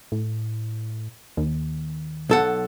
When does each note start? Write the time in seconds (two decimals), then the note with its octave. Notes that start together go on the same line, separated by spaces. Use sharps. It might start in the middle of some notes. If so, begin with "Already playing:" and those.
0.12 A2
1.37 D#2
2.29 B1 A4 F#5